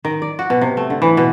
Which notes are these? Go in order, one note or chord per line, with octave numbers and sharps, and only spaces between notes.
D#3
D5
F#4
B2
C3
A3
D3
E3
B2